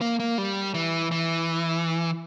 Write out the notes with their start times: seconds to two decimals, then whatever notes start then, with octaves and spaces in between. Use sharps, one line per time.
0.01 A#3
0.20 A#3
0.38 G3
0.74 E3
1.11 E3